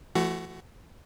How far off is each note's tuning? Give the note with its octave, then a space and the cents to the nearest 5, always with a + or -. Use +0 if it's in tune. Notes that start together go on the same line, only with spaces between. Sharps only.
F3 -45 A3 +0 F#4 +15